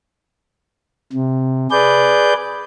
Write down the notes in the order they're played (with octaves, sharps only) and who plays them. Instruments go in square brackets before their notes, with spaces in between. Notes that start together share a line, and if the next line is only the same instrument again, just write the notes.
[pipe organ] C3
G#4 B4 D5 G6